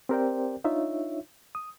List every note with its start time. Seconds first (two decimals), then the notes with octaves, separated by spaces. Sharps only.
0.09 C4 G4 A#4 C5 D5 G5
0.64 D4 D#4 F4 C#5 E5
1.55 D#6